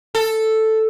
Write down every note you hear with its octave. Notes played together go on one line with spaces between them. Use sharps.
A4